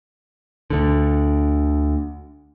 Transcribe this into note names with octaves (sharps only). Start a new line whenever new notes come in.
D2 D3